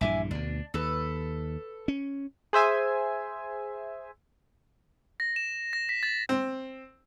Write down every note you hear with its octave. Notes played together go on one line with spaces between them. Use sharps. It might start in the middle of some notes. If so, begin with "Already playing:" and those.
A#1 G2 E3 E5 G#5 D6
D2 B2 D4
D#2 A4 B4
C#4
G#4 C5 E5 G#5
A#6
E7
A#6
B6
A6
C4